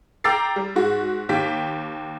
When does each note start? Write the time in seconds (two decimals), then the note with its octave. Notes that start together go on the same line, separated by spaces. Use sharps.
0.24 G5 A#5 D6 E6 A6 C7
0.56 G3
0.75 G#2 G#3 F#4
1.29 D#2 G4 G5 B6